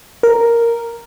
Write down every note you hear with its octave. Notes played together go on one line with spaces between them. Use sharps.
A#4